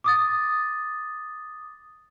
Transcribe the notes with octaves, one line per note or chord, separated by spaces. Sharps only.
D6 D#6 A6